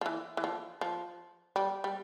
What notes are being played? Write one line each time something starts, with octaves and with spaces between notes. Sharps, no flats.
F3
E3
E3
F3
F3
G3
G3